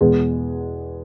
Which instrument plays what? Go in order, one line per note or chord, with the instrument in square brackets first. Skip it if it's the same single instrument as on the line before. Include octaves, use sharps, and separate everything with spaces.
[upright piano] E2 B2 G#3